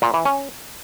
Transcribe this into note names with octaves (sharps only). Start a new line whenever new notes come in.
A#2
E3
C#4